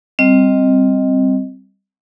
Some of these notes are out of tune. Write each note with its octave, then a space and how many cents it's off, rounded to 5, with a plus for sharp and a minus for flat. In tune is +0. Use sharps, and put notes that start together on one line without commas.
G3 +0 C4 +0 D#5 +0